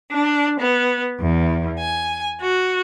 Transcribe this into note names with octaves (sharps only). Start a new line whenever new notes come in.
D4
B3
E2
G#5
F#4